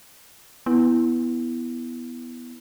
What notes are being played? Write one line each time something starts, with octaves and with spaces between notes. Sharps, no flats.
B3 E4